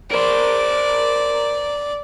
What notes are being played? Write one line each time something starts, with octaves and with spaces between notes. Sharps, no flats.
A#4 C5 D5